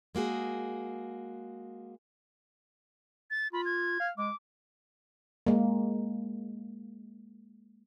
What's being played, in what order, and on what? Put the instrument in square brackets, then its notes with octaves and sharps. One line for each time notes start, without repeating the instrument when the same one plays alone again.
[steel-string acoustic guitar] G#3 A#3 F#4 G#4
[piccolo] A6
[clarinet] F4 [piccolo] B5
[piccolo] G#6
[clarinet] F5
[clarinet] G#3 [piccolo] D6
[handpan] G#3 A#3